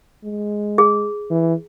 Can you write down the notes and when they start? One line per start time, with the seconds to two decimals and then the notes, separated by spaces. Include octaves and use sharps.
0.24 G#3
0.78 G#4
1.31 E3